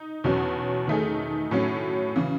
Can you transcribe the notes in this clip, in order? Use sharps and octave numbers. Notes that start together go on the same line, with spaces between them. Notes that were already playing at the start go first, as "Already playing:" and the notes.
Already playing: D#4
E2 B2 F#3 C#4
D#3 A3 D#4 G#4
A2 F#3 C#4
C#3 E3